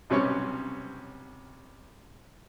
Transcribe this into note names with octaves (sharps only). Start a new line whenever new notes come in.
B1 C3 G3 C#4 C#5 C#6